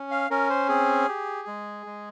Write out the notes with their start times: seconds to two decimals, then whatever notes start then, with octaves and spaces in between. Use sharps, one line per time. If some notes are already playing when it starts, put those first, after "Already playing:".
Already playing: C#4
0.11 F5
0.31 C#4 A#4
0.50 C5
0.69 C4 G#4
1.09 G4
1.48 G#3
1.86 G#3